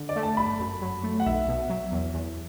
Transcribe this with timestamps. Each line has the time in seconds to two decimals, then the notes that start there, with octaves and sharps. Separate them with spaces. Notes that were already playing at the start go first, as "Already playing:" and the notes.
Already playing: D3
0.09 D5
0.16 A3
0.23 A5
0.37 G1 B5
0.60 F#2
0.82 F#3
1.03 A3
1.20 F#5
1.26 B1 E5
1.48 B2
1.70 F#3
1.92 E2
2.14 E2